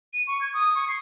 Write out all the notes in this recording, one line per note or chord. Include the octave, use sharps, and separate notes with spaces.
D#7
C#6
G#6
D#6
C#6
C7